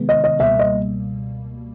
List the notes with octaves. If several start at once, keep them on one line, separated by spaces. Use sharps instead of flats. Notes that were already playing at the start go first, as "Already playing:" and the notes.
Already playing: C3 D#3 G#3 B3
D#5
D#5
C#2 B2 G3 A#3 E5
D#5